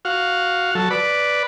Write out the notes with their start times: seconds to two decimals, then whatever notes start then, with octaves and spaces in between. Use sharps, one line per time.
0.05 F#4 F5
0.75 F#3 A4
0.90 B4 D5